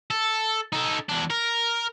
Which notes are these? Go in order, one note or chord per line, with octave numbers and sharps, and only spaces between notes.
A4
D#4 A4
E2 D4
A#4